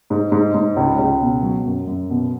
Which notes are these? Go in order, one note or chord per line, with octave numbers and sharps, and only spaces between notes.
G#2
G#2
G#2
C#2
C#2
B2
F#3
F#2
F#2
B2